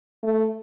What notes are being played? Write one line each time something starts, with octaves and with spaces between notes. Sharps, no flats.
A3